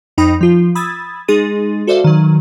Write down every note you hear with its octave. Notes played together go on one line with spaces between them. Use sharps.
F2 D#4 G5 B5 D#6
F3 F4
B5 D#6 E6 G#6 A6
G#3 D#4 G#4 C6 A6 D#7
F#4 A4 C5 D5 E5 F5
D#3 F#3